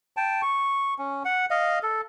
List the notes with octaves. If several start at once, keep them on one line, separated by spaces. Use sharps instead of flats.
G5 A5
C#6
C#4
F#5
D#5 F5
A4